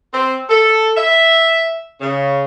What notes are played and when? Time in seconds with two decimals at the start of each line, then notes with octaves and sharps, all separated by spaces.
0.13 C4
0.49 A4
0.97 E5
2.01 C#3